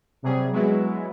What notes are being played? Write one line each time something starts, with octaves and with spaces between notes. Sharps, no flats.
C3 F#3 G3 G#4
F#3 G#3 B3 E4